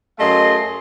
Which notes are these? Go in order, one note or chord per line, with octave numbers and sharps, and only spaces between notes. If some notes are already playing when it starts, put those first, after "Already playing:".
F#2 A3 G#4 D#5 F5 C6